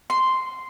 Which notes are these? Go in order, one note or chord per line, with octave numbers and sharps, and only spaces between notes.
C6